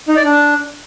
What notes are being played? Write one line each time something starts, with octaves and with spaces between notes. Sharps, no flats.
D#4
D5
D4